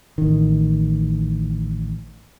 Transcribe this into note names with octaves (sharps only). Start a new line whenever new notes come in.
A1 D#3